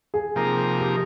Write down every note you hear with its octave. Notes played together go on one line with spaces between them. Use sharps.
G#4
C3 F3 A#3 D#4 A#4
G4